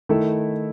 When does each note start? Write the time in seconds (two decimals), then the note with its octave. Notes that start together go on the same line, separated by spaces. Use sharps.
0.09 D#3 A3 E4 A4